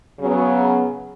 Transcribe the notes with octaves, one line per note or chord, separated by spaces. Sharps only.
C#3 F#3 B3